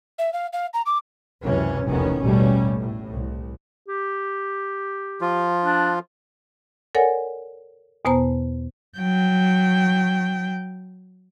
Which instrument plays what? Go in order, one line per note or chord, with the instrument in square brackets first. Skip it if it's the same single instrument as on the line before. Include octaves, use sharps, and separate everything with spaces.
[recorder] E5
F5
F5
A#5
D6
[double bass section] C#2 F#2 C3 E3 C#4
F1 B1 E2 D#3 B3 C#4
A1 D#2 B2 G3 A3 C#4
A2
C2
[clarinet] G4
[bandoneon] F3 F4
[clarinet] D4
[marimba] A4 A#4 C#5 D5 F#5 G#5
E2 B2 B3 C5 A5 A#5
[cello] F#3 G5